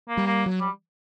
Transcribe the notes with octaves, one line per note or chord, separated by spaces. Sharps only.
A#3
G3
A#3
F#3
G3